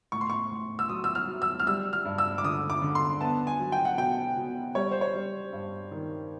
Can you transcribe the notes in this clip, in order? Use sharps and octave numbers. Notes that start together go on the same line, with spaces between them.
A2 C#6
C6
C#6
A2
E6
F#3 D#6
E6
F6
F#3
E6
F6
G3 E6
F6
G2
E6
D6
D3 D#6
D6
D3
C6
B3 A5
G#5
F#3
G5
F#5
B2 G5
B2
G3 C#5
C5
C#5
G3
G2
D#3